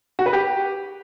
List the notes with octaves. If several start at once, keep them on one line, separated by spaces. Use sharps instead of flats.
F#4
B4
G4